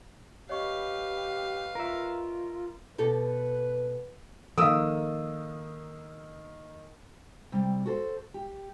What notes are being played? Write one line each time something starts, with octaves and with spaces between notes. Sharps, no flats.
G4 B4 C#5 D#5 F5 C#6
F4 A#4 E5
B2 G4 A4 B4
D#3 F3 A#3 A4 F5 D#6 E6
C3 G3
F#4 A4 C5
G4